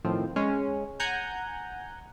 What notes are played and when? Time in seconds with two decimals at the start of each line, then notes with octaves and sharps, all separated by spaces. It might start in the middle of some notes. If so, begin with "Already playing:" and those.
0.04 A2 D#3 F3 C4
0.36 G#3 C#4
1.00 F#5 G#5 A#5 G6